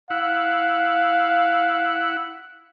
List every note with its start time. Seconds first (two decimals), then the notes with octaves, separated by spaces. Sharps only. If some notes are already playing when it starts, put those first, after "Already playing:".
0.10 E4 F5 F#5